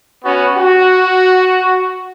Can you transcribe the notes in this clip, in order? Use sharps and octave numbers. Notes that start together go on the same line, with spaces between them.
B3 C#4 F#4
F#4